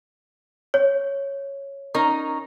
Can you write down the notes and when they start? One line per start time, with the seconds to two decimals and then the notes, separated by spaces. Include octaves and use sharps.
0.74 C#5
1.94 C#4 D#4 A#4